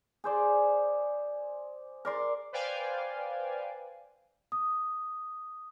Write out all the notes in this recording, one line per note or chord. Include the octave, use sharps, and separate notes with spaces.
G#4 C5 D5
A#4 D5 C6
B4 C5 D5 F5 G5 G#5
D#6